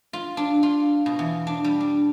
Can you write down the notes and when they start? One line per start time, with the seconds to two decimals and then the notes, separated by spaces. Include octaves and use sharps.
0.13 F4
0.37 D4
0.63 F4
1.06 B2
1.19 E2
1.47 D4
1.65 G3
1.80 D4